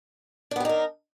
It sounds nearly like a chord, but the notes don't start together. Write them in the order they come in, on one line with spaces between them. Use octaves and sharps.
D4 B3 G4 D#4 A#4